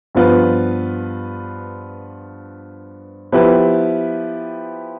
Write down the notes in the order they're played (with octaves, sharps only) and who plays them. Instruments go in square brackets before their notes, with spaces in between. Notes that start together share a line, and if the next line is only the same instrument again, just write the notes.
[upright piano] G2 F3 B3 F4 B4
F3 B3 E4 G4 B4